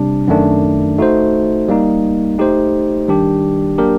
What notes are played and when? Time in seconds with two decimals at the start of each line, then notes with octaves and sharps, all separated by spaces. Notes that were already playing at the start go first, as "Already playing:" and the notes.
Already playing: C3 G3 D4
0.28 F#2 D#3 A3 D4
0.98 A3 D#4 F#4 C5
1.69 G3 A#3 D#4
2.38 A3 D#4 G4 C5
3.08 D#3 G3 D4 G4
3.78 F#3 A#3 D4 G4 A#4